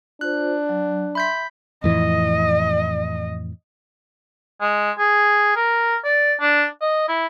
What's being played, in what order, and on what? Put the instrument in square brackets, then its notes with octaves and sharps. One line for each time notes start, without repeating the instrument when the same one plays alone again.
[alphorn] D4 [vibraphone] F4 C5 [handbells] F#6
[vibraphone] F#3
[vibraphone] E5 C6 [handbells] B5 G6 B6
[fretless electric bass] F2 A2 E3 [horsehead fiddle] D#5
[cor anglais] G#3
G#4
A#4
D5
D4
D#5
E4